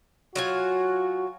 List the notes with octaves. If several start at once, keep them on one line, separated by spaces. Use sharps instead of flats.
F#3 F4 F#4 G#5